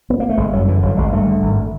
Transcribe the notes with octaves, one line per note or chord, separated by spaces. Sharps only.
B3
A#3
A3
G1 G#3
F#2 F#3
D3 E3
G1 F#3
G#1 G#3
G2 A3
D3
G#1